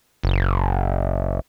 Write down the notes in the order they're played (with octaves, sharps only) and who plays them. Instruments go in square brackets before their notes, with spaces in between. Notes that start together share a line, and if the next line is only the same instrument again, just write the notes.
[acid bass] F#1